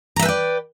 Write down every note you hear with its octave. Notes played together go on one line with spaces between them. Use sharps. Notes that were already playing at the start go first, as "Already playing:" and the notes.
B4 D5 E5 G5 A#5